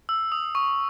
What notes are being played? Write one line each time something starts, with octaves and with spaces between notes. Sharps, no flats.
E6
D#6
C#6